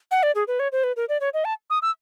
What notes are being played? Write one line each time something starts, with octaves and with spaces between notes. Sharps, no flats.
F#5
D5
G#4
B4
C#5
C5
B4
A#4
D5
C#5
D#5
A5
D#6
E6